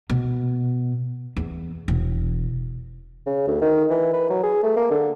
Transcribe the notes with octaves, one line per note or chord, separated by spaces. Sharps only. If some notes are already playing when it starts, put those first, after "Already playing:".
B2
E2
E1
C#3
D2
D#3
E3
B4
F#3
G#4
A3
A#3
D3